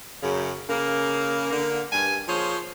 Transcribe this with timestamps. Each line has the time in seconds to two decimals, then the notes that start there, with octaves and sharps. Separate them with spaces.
0.22 F#2 C#3
0.69 C#3 A#3
1.50 D3 A#3
1.92 G2 G#5
2.28 F3 A#3 G#4 C5 C#5